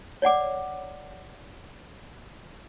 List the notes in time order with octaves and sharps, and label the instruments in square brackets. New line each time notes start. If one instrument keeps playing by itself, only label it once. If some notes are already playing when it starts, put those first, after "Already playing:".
[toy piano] C#5 D5 F#5 D6